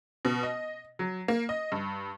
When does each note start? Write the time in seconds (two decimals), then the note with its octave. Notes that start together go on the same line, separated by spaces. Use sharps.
0.25 B2
0.43 D#5
0.99 F#3
1.28 A#3
1.49 D#5
1.72 G2